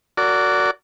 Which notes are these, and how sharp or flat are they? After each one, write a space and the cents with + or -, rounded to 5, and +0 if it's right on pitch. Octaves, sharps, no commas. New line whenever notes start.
F#4 +0 A#4 -30 D5 -20